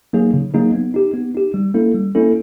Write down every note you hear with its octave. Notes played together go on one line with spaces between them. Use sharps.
F#3 A#3 D#4 G#4
C#3
F#3 A#3 D#4 G#4
B3
D#4 G4
B3
D#4 G4
G3
A#3 C#4 E4 A4
G3
A#3 C#4 E4 A4